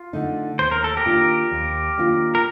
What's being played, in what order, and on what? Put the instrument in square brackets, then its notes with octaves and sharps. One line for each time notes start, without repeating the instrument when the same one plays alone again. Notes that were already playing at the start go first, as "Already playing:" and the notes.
Already playing: [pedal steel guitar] F4
[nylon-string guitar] D3 A3 D#4
[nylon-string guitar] D#2 [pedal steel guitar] C5
[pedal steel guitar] A#4
A4
G4 A#4
[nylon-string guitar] D#3 A#3 D4 F4
D#2
D#3 A#3 D4 F4
[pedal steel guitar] A#4